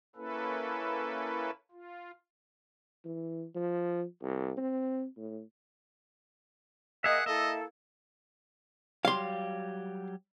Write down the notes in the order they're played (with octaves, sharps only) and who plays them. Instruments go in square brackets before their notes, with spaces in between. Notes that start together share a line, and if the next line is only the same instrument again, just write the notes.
[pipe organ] A#3 C#4 E4 A4 B4
F4
[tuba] E3
F3
C2
C4
A2
[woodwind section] A#3 A#4 D#5 [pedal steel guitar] G#4 E5 [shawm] F#5
[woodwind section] A#3 E4 A4 [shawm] D#5 [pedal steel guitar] E5
[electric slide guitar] F#3 G3 G4 [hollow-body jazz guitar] F5 C6